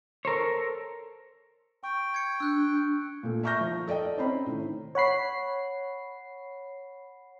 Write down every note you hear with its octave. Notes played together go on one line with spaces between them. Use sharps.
A4 A#4 C5 C#5
G5 C#6
G#6 C#7
D4 E6 F#6 G6
A#2 A3
E5 A#5 C#6 F6 G6 A#6
F3
A4 D5 D#5 G5
C4 C#4 C5 A#5 B5
A2 D#3
C#5 F#5 B5 C7